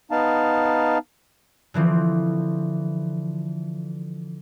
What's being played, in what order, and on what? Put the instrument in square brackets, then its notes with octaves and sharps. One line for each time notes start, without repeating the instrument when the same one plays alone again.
[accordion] B3 D#4 F5 A5
[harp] D3 E3 F3 C4